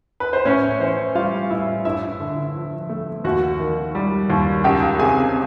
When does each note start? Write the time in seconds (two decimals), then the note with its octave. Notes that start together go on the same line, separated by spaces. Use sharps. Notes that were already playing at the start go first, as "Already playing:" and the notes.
0.20 B4
0.33 C5
0.45 A2 C#4 C#5
0.80 E3 C5
1.15 G3 F4 F5
1.50 A2 E4 E5
1.85 G2 E4 E5
2.20 D3
2.55 F3
2.89 A3
3.24 D#2 F#4 F#5
3.60 D#3
3.95 G3
4.30 D#2
4.64 C#2 G4 G5
4.99 C3 G#4 G#5